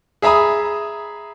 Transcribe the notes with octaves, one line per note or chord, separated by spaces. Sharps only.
G#4 E5 A#5 B5 D#6